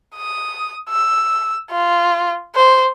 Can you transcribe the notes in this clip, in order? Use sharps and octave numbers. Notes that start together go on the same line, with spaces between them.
D#6
E6
F4
C5